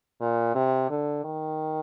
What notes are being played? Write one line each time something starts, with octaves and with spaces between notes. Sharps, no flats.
A#2
C3
D3
D#3